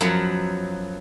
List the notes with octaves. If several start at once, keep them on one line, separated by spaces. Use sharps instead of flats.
F#2 F3 F#3 B3